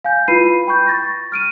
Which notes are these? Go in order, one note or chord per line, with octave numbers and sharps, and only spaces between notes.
F5 G#5 G6
E4 F4 B4 B5 C7 D#7
G5 B5 C#6 G6
C#6 A6 A#6
F6 D7 D#7